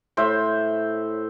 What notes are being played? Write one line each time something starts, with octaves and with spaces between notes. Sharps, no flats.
A2 C5 E5